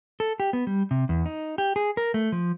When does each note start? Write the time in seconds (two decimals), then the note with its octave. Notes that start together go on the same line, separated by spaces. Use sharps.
0.20 A4
0.40 G4
0.53 B3
0.67 G3
0.91 C3
1.09 E2
1.26 D#4
1.58 G4
1.76 G#4
1.97 A#4
2.14 A3
2.32 F3